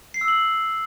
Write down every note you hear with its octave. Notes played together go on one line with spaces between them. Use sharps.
C7
E6
F#7